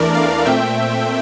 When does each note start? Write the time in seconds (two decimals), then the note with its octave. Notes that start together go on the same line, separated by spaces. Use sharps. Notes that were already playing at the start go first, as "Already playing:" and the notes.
Already playing: E2 E3 A3 D4 A#4 D5
0.15 D5 F5
0.45 A#2 A3 C4 E5 G5